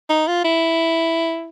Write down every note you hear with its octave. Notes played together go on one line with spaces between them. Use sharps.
D#4
F4
E4